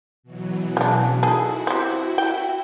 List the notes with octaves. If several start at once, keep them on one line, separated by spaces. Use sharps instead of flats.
B2 E3 F#3
C#3 D4
D#4 E4 F#4 G#4 A4
C4 G4
G5